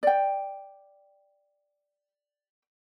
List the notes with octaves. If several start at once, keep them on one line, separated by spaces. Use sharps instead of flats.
D5 G5